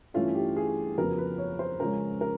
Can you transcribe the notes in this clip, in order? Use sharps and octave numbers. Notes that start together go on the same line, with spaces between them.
G2 E3 A3 C#4 F4
G4
G#4
F2 C#3 F#3 B3 A#4
B4
C#5
C5
C#3 F3 G#3 C#4 A#4
A#4